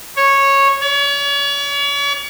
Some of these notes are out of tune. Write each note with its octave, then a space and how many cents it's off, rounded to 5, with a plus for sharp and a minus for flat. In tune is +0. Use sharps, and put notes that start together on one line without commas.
C#5 -10
C#5 +40